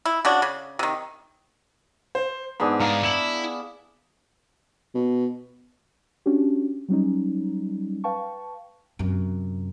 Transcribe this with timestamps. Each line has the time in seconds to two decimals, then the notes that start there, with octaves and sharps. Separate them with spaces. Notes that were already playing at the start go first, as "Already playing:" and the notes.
0.06 E4
0.25 C#3 D4 F#4
0.42 C#3
0.79 C3 D#3
2.15 C5
2.60 G#2 B3 D4 G#4
2.80 G#2 G#4 F5 A#5
3.03 E4 C#7 E7 F#7
4.94 B2
6.26 C#4 D4 F#4 G4
6.89 F#3 G3 C#4 D#4
8.04 B4 F5 G5 A5 C#6
8.99 F#2 C3